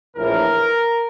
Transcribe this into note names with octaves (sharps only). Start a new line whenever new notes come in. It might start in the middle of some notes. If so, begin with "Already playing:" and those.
A#1 A2 E3 A#4